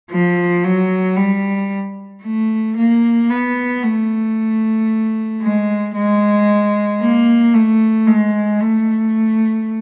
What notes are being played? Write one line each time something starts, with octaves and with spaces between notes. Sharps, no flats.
F3
F#3
G3
A3
A#3
B3
A3
G#3
G#3
A#3
A3
G#3
A3